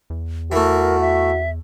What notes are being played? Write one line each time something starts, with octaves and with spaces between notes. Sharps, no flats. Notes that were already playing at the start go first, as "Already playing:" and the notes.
E2
E3 A3 F#4 A#4
E5